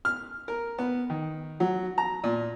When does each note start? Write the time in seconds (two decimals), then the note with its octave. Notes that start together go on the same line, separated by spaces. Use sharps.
0.05 F6
0.48 A#4
0.78 B3
1.10 D#3
1.60 F#3
1.98 A#5
2.24 A#2